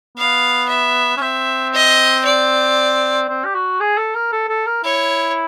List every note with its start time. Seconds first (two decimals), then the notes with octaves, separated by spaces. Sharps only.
0.17 B3 F5
0.69 E5
1.17 C#4
1.21 C4 E5
1.73 D#5
2.25 D5
3.29 C4
3.45 G4
3.54 F#4
3.80 G#4
3.98 A4
4.15 A#4
4.32 A4
4.49 A4
4.67 A#4
4.84 E4 C#5